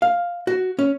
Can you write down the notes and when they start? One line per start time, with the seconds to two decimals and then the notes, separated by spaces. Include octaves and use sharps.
0.02 F5
0.47 F#4
0.79 C#4